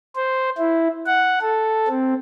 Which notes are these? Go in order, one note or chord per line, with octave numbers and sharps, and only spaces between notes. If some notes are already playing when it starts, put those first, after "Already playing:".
C5
E4
F#5
A4
C4